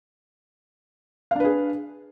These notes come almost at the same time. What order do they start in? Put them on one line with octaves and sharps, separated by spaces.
F5 D4 B4 G#4